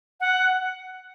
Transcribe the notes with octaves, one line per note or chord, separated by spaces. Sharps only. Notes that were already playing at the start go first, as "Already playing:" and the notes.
F#5